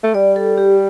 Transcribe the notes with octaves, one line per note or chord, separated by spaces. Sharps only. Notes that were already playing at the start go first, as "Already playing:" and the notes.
A3
G3 D5
A4
G4